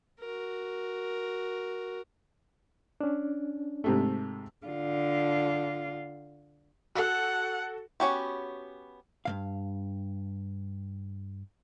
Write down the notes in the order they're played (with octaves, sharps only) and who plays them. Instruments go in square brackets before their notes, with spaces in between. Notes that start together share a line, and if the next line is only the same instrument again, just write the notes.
[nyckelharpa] F#4 A#4
[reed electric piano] C#4 D4
[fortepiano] G#2 C3 A3
[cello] D3 F4
[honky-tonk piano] F#4 A4 [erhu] F#5
[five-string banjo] B3 C#4 F#4 G4
[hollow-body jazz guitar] G2 C3 F5